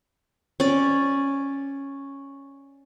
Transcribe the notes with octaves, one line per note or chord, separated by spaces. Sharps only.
C#4 D5